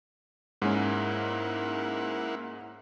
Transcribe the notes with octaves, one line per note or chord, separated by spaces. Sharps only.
G#2 G#3 A#3 C#4 E4 F#5